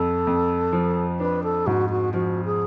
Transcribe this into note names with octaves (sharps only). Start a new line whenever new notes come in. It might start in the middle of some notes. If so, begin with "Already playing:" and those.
Already playing: F2 A4
F2
F3
D4 B4
A4
G#2 F#4
F#4
F3 F#4
G#4